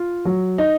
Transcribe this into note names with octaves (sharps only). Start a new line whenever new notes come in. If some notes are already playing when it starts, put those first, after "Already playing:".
Already playing: F4
F#3
D#4